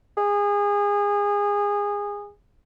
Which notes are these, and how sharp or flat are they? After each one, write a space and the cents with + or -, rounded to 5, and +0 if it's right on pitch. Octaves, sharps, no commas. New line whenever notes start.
G#4 -25